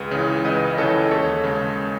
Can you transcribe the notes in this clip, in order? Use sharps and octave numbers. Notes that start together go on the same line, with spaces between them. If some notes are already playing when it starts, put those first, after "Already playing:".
Already playing: C#2 G#4 B4
C#3 E3
C#2 B4 D#5
D#5
C#3 E3 A4 C#5
D#2 A4 C#5
C#3 G#3